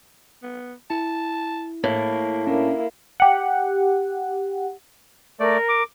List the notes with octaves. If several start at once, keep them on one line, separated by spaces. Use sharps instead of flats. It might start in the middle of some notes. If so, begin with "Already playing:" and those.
B3
E4 A5
A2 A#3
A#3 C#4 D4 E4
G4 F#5
A3 A#4 D5
D6